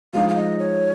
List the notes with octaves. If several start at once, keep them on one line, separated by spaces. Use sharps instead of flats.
F3 G#3 D#4 F5
F5
D#5
C#5